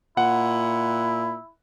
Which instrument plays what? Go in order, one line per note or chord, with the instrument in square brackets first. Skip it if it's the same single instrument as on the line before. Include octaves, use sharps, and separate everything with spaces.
[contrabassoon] A#2 [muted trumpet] E4 [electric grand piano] F#5